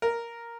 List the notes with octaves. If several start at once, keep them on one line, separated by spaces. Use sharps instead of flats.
A#4